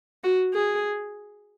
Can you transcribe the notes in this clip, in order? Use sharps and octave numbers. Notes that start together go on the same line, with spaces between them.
F#4
G#4